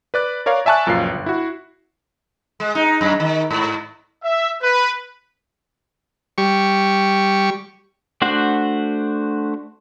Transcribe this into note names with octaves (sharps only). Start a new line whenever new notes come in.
B4 D5 F#6
A#4 C#5 D5 F5 A#5
D5 E5 G#5 A5 C#6 F#6
C#2 F#2 A#2 F3 F5 C7
G1
E4 F#4
G#3
D#4
F#2
D#3
G#2
E5
B4
G3 C#6
A3 D4 F#4 C5 F#5